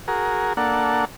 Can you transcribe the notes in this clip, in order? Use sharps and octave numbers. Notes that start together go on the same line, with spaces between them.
F#4 G#4 A#4
A#3 D4 A4 F#5